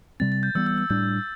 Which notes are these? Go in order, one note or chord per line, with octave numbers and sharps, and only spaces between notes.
C3 G3 C4 A6
A6
G6
E3 G3 B3 E6
E6
E6
A2 G3 D4 G6